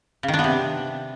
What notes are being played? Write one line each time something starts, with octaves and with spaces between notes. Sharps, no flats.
C#3
D#3
D4
B3
C3